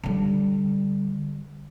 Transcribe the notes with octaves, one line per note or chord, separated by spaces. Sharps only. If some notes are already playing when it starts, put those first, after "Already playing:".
D3 G3